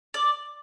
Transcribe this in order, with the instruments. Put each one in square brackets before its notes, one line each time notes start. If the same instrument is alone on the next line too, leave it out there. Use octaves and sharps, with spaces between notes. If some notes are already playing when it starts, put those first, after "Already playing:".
[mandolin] D5